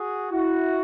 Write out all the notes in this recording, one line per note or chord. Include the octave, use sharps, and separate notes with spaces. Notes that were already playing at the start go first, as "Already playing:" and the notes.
Already playing: F#4 G#4
E4 F#4